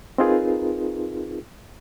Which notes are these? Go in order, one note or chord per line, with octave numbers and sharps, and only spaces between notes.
C4 D#4 F4 G#4 A#4 B4